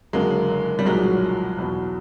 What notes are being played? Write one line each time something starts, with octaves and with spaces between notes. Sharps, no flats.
F#1 F#2 D3 F#3 G#3 A#3
G3
B1 A#2 F3 F#3 G#3
F#3
E2 B2 F#3